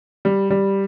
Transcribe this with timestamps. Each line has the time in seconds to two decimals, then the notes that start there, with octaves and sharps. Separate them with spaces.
0.25 G3
0.50 G3